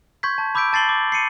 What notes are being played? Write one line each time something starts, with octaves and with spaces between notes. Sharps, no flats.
C6 C#6 G6 G#6 B6
A5
B5 D6 E6 G6 B6 D7
A5 A6 C7 F#7 G7
D6
C7 C#7 D#7